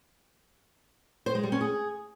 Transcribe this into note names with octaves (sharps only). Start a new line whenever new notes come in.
C5
G#3
G3
C#4
G#4